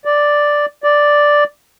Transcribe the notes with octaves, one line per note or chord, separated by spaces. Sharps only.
D5
D5